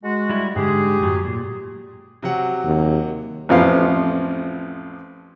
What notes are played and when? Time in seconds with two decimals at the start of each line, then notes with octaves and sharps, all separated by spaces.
0.04 G#3 F#4
0.30 G3 E4
0.56 G#2 D3 G#3 G4 G#4
1.02 F#2 A2 F#3
1.24 A#2
2.23 C3 F#3 F#5
2.64 D#2
3.49 A1 F2 F3 B3 F5